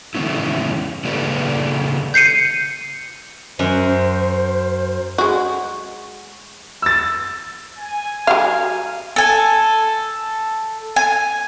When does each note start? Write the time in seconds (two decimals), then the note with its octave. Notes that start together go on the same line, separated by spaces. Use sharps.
0.15 C#3 E3 G#3 B3 C#4 E4
1.05 C#3 A#3 G4 A4 B4 D5
2.14 G6 C7 C#7 D#7
3.59 F#2 C5
5.18 G#3 F#4
6.82 E6 A6
7.78 G#5
8.27 F#3 G4 F5
9.16 A4 G#5
10.96 G#5